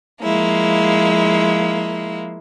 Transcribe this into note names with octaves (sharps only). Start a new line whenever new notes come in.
F3 G#3 A#3 E4